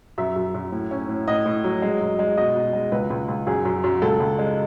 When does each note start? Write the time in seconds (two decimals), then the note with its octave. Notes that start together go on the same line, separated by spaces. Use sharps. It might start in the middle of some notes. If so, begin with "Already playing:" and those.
0.18 F#2 E5
0.36 F#2
0.54 F#2
0.72 A2
0.91 C#4
1.09 A2
1.28 A2 D#5
1.46 A2
1.64 F#3
1.82 G#3
2.01 F#2
2.19 G#3
2.37 B2 D#5
2.55 B2
2.73 G#3
2.92 C#2 B4
3.10 C#2
3.28 C#2
3.47 F#2 G#4
3.65 F#2
3.84 F#2
4.02 C#2 A4
4.20 C#2
4.39 G#3